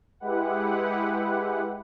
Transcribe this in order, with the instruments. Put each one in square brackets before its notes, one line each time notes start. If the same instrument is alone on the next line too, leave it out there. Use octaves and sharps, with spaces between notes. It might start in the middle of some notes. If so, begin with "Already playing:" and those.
[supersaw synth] G#3 E4 G4 B4 F#5